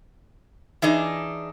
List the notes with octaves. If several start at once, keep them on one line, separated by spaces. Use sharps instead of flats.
E3 D4 D#4 G#4